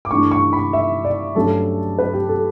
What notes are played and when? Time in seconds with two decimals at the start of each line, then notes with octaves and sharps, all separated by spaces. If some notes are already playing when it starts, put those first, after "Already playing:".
0.05 D6
0.11 G2 E3 A3 D4 C#6
0.31 C#6
0.53 B5
0.73 E5
1.05 D5
1.35 G2 F#3 A3 C#4 A4
1.98 B4
2.13 G4
2.28 A4